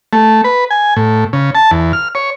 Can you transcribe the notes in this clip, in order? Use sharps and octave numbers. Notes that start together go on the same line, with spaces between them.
A3
B4
G#5
A2
C#3
A5
E2
F6
C#5